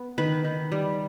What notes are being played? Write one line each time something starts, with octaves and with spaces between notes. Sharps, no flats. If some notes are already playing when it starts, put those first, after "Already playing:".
Already playing: B3
D#3 B4
D#3
G3